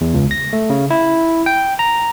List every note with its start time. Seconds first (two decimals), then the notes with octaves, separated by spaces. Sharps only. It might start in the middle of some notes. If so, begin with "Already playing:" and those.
0.01 E2
0.14 C#2
0.31 A#6
0.53 A3
0.70 C#3
0.90 E4
1.46 G5
1.79 A#5